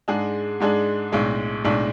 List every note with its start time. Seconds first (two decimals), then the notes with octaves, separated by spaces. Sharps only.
0.08 G#2 G#3 D4 G#4
0.60 G#2 G#3 D4 G#4
1.12 B1 A2 G#3 D4
1.64 B1 A2 G#3 D4